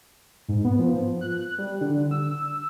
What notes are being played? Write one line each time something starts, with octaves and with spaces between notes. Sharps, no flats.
G#2
B3
F3
F#6
F#6
G3
D3
E6